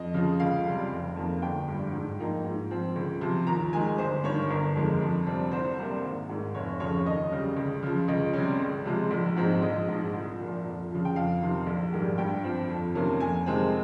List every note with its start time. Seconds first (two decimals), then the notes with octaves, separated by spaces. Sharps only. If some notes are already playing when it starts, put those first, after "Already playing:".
Already playing: F2 D#5
0.14 C#3 F3
0.40 C#2 F5
0.65 C3 G3
0.91 F1
1.16 F2 D#3 A#3
1.42 G1 G5
1.68 G2 G3
1.93 G#2
2.18 F3 A#3 D#4
2.44 G#2
2.70 F3 C4
2.96 C#2
3.21 C3 F3
3.47 D#2 A#5
3.73 D#3 G#3 G#5
3.98 G1 C5
4.24 G2 C#5
4.28 D#3
4.50 G1 A#4
4.75 F2 D#3 G#3
5.01 F2
5.26 C3 G3 C4
5.51 C2 C5
5.78 C3 G3 A#3
6.03 G#1
6.29 G#2 D#3
6.55 F1 C#5
6.80 F2 C#3 C#5
7.06 D#2 D#5
7.32 C#3 G3
7.56 C#2
7.83 C#3 F3
8.08 C#2 D#5
8.33 C3 G3 C#4
8.60 C#2
8.86 C3 F3 G#3
9.11 A#1
9.36 G#2 F3 C4 D#4
9.62 A#1 D#5
9.88 G#2 F3
10.13 C2
10.39 A#2 F3
10.65 F2
10.91 C#3 F3
11.05 G5
11.16 F2 F5
11.42 C3 D#3
11.67 A#1
11.93 G#2 D#3 G3
12.18 G2 G5
12.44 F3 C4
12.70 F2
12.95 C3 D#3 A#3 C#4
13.20 F2 G#5
13.46 C3 D#3 G#3 C4